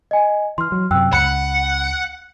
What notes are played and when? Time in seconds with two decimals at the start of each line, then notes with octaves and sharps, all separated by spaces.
0.11 D#5 G#5
0.58 E3 C6 F6
0.72 F#3
0.91 F#2 C3 G5 E6 F#6
1.13 C#2 F#5 B5 F#6 C#7